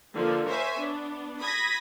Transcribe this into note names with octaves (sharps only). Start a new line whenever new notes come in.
D3 F3 A#3
A#4 C5 C#5 E5 G#5
B3 D4
B5 D#6 G#6 A#6 B6